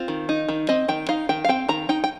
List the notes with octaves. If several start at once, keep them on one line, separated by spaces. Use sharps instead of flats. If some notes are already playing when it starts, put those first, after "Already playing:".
Already playing: C4 F4
D#3
D#4
D#3
C4 D#5
D#3 G5
D#4 F5
D#3 G5
F5
C4 G5
D#3 A#5
D#4 G5
G5